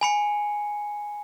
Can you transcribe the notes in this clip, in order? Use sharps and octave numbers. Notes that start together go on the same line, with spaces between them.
G#5 B5 C#7